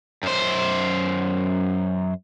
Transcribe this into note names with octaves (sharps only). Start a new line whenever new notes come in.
F#2 C5